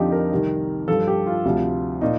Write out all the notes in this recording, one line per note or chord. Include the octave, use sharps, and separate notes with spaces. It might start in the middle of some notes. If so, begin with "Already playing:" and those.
Already playing: F2 D3 F3 D#4 G4
A#4
C2 C3 D#3
G2 F3 A4
G4
F4
D2 C3 F3
A#2 D#4